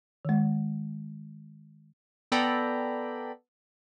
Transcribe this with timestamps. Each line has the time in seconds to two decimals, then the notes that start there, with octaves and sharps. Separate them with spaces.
0.25 D#3 G#3
2.32 B3 A4 D5 G5 A#5 B5